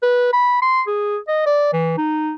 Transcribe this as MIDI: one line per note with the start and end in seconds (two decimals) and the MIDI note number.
0.03 0.28 71
0.33 0.57 83
0.62 0.81 84
0.87 1.17 68
1.28 1.45 75
1.46 1.68 74
1.73 1.96 52
1.98 2.33 63